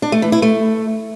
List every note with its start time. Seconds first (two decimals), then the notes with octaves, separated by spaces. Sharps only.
0.02 D4
0.12 A3
0.22 E3
0.32 E4
0.42 A3